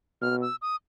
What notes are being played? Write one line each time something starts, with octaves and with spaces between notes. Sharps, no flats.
B2 F6
E6
D#6